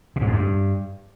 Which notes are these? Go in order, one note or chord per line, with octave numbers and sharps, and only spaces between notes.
B2
G#2
F2
G2